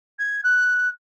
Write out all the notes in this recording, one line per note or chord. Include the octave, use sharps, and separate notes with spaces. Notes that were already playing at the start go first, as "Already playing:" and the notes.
G#6
F#6